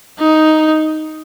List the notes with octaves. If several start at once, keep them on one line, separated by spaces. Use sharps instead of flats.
D#4